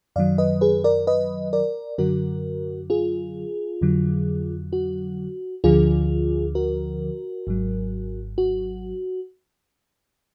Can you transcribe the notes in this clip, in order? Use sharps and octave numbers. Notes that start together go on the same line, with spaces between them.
F#2 D#3 F#3 D5 F5
B4 D#5
G#4 B4
A#4 D5
B4 D#5
A#4 D5
F#2 D3 F#3 F#4 A#4
F4 G#4
F2 D3 F#3
F#4
D2 D3 F3 F4 G#4
F#4 A#4
G#1 G#2 F#3
F#4